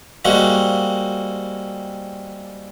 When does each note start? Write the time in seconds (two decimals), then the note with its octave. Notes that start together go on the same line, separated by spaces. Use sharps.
0.25 G3 G#3 A#3 C4 F#4